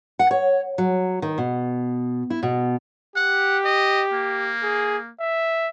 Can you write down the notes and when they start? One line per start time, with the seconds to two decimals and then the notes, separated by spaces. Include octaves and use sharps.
0.19 F#5
0.31 C#5
0.78 F#3
1.22 D#3
1.38 B2
2.30 E4
2.43 B2
3.16 G4 F#5
3.64 D#5
4.13 A#3
4.63 G#4
5.20 E5